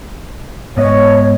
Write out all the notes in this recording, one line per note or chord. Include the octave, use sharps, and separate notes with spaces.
G#2 B3 C#5 D#5